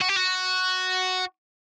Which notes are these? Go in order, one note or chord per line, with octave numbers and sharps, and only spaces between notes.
F#4
G4
F#4